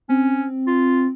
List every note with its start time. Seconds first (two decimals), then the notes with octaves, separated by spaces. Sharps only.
0.09 C4 C#4
0.67 F4